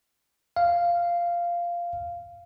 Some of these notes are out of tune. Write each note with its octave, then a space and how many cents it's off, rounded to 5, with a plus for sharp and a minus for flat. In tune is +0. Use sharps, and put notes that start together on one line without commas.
F5 -10